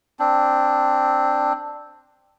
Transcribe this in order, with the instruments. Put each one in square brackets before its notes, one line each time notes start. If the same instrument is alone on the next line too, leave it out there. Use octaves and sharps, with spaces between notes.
[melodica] C4 D4